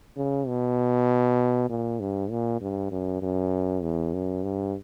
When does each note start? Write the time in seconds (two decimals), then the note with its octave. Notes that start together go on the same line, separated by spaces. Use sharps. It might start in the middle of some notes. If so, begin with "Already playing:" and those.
0.17 C#3
0.48 B2
1.69 A#2
2.00 G2
2.30 A#2
2.61 G2
2.91 F#2
3.22 F#2
3.83 E2
4.14 F#2
4.43 G2